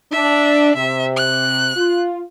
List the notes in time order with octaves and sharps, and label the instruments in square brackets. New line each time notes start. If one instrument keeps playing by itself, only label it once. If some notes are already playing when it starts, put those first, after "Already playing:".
[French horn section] D4 [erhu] E5
[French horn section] C3 [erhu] E5
[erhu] F#6
[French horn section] F4